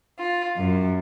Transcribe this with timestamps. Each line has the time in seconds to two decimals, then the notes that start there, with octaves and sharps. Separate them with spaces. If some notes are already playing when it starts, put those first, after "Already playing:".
0.19 F4
0.55 F#2